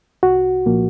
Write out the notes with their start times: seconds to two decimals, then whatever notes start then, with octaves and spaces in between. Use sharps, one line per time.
0.23 C2 F#4
0.66 A#2 F3 A#3